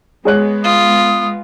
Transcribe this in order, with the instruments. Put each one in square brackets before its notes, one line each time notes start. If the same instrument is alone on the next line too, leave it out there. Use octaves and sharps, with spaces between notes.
[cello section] G#3 B3 [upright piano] G#4 C#5 F#6
[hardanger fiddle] F4 [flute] D#6